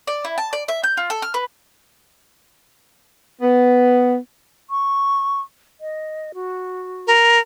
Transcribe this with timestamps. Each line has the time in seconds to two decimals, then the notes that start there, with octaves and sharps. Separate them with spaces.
0.07 D5
0.25 E4
0.38 A5
0.53 D5
0.68 E5
0.83 G6
0.97 F4
1.10 A4
1.22 F6
1.34 B4
3.42 B3
4.70 C#6
5.81 D#5
6.34 F#4
7.07 A#4